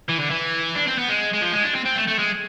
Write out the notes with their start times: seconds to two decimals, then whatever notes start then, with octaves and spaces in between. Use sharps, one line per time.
0.09 E3
0.20 D3
0.31 E3
0.75 D4
0.87 C4
0.98 B3
1.08 G#3
1.33 G#3
1.41 F3
1.53 G#3
1.63 D4
1.75 C4
1.86 C4
1.96 A3
2.08 A3
2.19 G#3